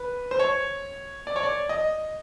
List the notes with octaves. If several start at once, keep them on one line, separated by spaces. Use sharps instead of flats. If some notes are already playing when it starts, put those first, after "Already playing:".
Already playing: B4
C5
C#5
D5
C#5
D5
D#5